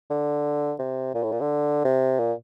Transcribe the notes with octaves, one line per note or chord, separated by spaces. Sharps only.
D3
C3
A#2
A2
A#2
D3
C3
A#2